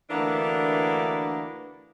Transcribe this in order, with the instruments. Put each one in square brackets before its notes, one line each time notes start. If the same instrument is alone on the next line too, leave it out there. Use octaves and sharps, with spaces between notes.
[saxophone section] D2 E3 A#3 B3 D4